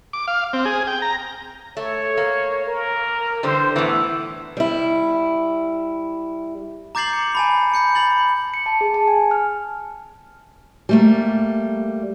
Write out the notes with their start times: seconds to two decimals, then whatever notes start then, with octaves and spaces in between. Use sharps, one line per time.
0.13 D6
0.28 F5
0.53 C4
0.65 G#4
0.87 G5
1.02 A#5
1.77 A3 C#5
2.17 A#3
2.66 A#4
3.43 D3 E3 G3 C5
3.76 A2 E3 B3
4.57 G3 E4
6.95 A#5 D6 G6 A6 C7 F#7
7.13 C#7
7.35 G#5 A5 B5
7.74 B5 G6 C#7
7.95 B5 A6 F#7
8.54 C#7
8.66 A5
8.81 G#4
8.94 A5
9.08 G#5
9.31 F6
10.89 G3 A3 A#3